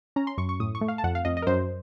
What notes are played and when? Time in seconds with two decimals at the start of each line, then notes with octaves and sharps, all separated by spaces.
0.16 C#4 A#5
0.27 C6
0.38 F#2 C#6
0.49 C#6
0.60 A2 D#6
0.75 C#6
0.81 A3
0.88 F5
0.98 A5
1.04 F2 F#5
1.15 F5
1.25 F2 D#5
1.37 D#5
1.42 A#4
1.47 F#2 C5